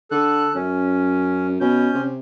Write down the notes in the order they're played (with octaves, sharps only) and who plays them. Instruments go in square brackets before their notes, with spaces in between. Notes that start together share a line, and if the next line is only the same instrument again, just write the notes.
[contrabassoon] D3 [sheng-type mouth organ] A4 F#6
[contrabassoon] F#2 [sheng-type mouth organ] C#4
[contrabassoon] B2 [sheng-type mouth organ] C#4 G6
[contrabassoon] C3